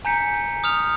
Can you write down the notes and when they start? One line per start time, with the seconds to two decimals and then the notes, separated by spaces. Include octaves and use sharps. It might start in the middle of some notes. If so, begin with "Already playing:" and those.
0.05 G#5 A#5 G6 B6 C#7
0.64 D#6 F6 F7